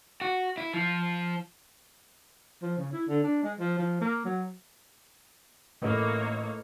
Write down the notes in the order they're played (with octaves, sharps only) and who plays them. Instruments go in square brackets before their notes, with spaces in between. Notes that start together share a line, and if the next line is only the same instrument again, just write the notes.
[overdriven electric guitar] F#4
E4
F3
[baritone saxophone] F3
C#3
E4
D3
D4
G#3
F3
F3
A#3
F#3
[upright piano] A1 [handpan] A3 B4 D#5 [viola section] A#3 C#5